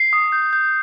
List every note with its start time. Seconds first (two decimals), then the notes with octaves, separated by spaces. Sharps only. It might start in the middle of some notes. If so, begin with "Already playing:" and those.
Already playing: C7
0.13 D#6
0.32 G6
0.53 G6